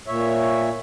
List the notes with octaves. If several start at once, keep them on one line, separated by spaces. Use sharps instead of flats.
A#2 C#5 E5